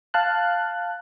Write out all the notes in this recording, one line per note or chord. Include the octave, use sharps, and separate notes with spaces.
F5 A5 F#6